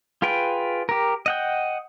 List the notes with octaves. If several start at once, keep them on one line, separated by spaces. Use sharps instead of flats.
F4 G#4 B4 G5
G4 A#4
D#5 F#5 G5